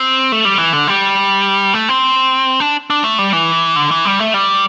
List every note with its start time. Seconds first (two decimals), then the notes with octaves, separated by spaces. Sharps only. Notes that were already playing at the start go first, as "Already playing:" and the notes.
Already playing: C4
0.32 A3
0.45 G3
0.58 E3
0.73 D3
0.88 G3
1.74 A3
1.89 C4
2.60 D4
2.90 D4
3.04 A3
3.19 G3
3.33 E3
3.76 D3
3.91 E3
4.05 G3
4.19 A3
4.34 G3